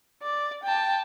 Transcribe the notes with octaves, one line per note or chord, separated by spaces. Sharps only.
D5
G5 A5